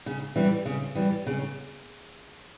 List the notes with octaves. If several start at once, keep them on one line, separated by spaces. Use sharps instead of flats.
C#3
E3 G3
C#3
E3 G3
C#3